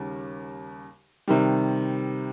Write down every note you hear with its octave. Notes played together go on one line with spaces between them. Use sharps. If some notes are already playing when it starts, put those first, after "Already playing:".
Already playing: D#2 C#3 G3
C3 D#3 G3